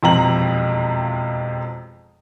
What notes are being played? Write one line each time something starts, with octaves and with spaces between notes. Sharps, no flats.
E1 F2 C3 F3 A#5 F#7